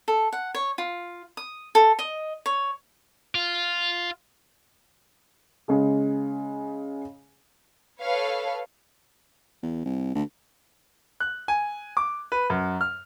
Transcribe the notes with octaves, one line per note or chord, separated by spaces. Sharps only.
A4
F#5
C#5
F4
D#6
A4
D#5
C#5
F4
C#3 G#3 G#4
A4 B4 C#5 F5
E2
C2
D2
F#6
G#5
D6
B4
F#2
F6